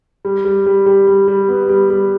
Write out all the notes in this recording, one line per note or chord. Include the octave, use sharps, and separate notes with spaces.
G3
G3
G3
G3
G3
G3
B3
G3
G3